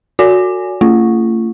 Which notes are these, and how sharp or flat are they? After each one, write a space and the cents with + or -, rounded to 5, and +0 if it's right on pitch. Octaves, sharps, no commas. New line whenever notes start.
F#4 -15 D5 -40 G#5 +5
A3 +40 F4 -35